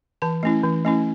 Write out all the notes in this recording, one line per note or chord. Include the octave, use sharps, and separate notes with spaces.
E3 A5
A3 C#4 E4
E3
A3 C#4 E4